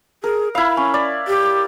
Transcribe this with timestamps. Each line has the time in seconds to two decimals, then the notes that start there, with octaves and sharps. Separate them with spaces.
0.24 G#4 A#4
0.55 E4 F5 B5
0.77 C#4
0.94 D5
1.27 G4